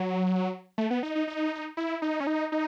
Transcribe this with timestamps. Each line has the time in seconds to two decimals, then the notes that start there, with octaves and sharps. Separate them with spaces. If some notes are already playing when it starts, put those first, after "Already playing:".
Already playing: F#3
0.78 A3
0.90 B3
1.03 D#4
1.15 D#4
1.27 D#4
1.77 E4
2.02 D#4
2.20 C#4
2.27 D#4
2.52 D#4